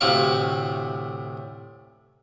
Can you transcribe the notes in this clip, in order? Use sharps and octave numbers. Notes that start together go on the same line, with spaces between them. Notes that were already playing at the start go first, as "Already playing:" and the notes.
D2 A2 C3 E4 F5 C#6